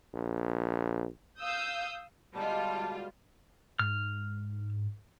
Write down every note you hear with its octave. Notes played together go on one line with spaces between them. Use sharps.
A#1
F5 D#6 E6 G6
B2 D3 G3 G#3 F4 A5
G#2 F6